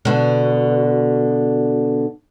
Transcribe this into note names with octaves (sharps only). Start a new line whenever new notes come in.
B2 D3